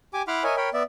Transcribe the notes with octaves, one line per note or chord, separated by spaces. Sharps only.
G4 G#5 D6
E4 F#5 B5 C6 D6 F6
A#4 C#5 D#5 E5 G#5
A#4 C#5 G5 B5
B3 D5 E5